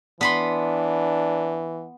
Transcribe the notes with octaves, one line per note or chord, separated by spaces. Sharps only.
E3 B3 D4 B5 C6